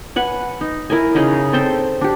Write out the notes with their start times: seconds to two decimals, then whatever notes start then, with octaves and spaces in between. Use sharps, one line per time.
0.16 B4 F#5 G#5
0.61 D#4
0.90 E4 A#4 D#5 G#5
1.15 C#3 D#4 G#4 D#5
1.53 C4 A4 C5 G5
2.01 D4 G4